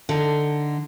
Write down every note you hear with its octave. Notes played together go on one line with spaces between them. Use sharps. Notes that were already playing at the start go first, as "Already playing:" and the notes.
D3 D#4